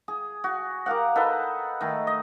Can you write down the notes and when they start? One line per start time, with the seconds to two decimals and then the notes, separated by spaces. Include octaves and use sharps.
0.08 G#4
0.44 F#4
0.86 G4 A#4 F5 F#5
1.15 D#4 A4 B4 F#5
1.81 D#3 A3
2.07 D#5